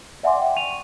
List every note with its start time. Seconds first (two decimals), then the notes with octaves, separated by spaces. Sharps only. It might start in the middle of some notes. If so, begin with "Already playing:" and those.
0.23 D5 E5 F#5 G#5 C6 D6
0.38 G5
0.57 C#6 D#7 F7